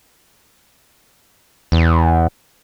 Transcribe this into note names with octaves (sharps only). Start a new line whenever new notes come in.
E2